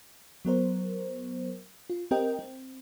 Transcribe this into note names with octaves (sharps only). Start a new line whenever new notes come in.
F#3 B3 A#4 C5
F4
C4 G4 A#4 D#5 G5
C4